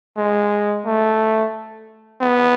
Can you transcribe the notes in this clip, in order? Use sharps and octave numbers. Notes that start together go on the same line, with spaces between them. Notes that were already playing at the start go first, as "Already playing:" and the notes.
G#3
A3
B3